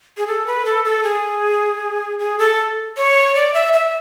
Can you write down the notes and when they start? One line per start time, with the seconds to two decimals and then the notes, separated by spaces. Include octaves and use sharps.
0.17 G#4
0.27 A4
0.46 B4
0.65 A4
0.85 A4
1.03 G#4
2.19 G#4
2.38 A4
2.97 C#5
3.35 D5
3.54 E5
3.73 E5